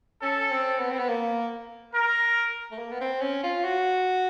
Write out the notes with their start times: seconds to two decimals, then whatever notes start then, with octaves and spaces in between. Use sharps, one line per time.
0.22 C#4 A4
0.51 C4
0.80 B3
0.91 C4
0.99 B3
1.08 A#3
1.93 A#4
2.72 A3
2.79 A#3
2.92 B3
3.01 C4
3.21 C#4
3.44 F4
3.64 F#4